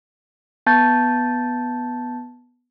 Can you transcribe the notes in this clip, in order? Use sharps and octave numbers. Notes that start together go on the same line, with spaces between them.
B3 A5 G6 A6